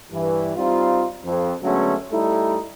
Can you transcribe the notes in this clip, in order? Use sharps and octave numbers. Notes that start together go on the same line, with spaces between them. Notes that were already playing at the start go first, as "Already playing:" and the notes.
G2 E3
G3 C4 D#4 F4
F2
D3 F#3 G#3 A3 B3 C#4
G3 A3 D#4 E4